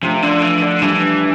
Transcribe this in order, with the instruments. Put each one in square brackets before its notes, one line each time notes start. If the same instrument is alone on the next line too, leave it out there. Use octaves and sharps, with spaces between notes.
[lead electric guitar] C3 [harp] F3 A3 D4 F4
[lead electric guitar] D3
E3
D3
[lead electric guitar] E3 [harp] G3 D4 G4